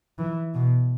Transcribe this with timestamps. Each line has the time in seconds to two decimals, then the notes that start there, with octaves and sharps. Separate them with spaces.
0.19 E3
0.54 B2